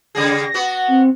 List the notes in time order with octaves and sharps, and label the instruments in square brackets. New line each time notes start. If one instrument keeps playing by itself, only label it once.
[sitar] C#3 G3 G#4 [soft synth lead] A#6
[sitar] B3 F#4
[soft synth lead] C4